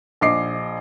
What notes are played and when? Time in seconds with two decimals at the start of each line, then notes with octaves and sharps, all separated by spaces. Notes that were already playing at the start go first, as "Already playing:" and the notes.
0.21 A#1 D#5 D6 C7